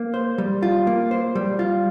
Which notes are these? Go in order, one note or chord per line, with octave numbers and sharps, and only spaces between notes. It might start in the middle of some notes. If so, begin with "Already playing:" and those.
Already playing: A#3
C5
G3
F4
A#3
C5
G3
F4